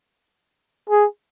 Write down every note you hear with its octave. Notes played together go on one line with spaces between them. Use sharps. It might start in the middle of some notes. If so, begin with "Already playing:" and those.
G#4